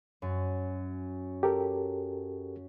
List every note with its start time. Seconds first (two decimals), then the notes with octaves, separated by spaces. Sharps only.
0.22 F#2
1.43 G4 A4 A#4